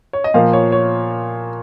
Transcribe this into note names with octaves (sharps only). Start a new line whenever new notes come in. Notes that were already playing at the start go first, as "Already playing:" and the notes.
C#5
D#5
A#2 F3 A#3 F5
C#5
C#5